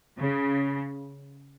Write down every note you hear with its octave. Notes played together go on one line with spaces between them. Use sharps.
C#3